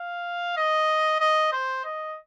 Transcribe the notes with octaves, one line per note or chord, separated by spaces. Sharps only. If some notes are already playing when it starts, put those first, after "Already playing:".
Already playing: F5
D#5
D#5
C5
D#5